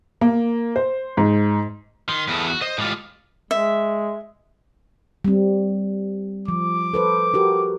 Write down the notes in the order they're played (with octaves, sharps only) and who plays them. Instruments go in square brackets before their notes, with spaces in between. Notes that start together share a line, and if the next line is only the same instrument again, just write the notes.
[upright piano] A#3
C5
G#2
[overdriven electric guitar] D#3 [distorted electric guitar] C6
[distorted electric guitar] E2 [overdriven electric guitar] B3 A4
[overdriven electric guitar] F#4
[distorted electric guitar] C5 [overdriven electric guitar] D#5
[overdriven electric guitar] A2 F4 [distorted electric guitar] G#3 G4
[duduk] G#3 [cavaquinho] E5
[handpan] G3 C4
[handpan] F3 [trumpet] D6
[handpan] A4 B4 C5
F#4 G4 A#4